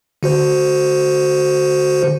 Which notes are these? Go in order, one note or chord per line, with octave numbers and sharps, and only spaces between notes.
D3 F#4 C5